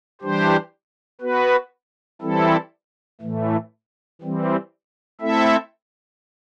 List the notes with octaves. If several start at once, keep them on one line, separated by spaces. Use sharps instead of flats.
E3 G3 D4 G4 C5
B3 F#4 B4
E3 G3 C4 E4 A4
A2 E3 A3
E3 G3 C4
A3 C4 E4 A4 E5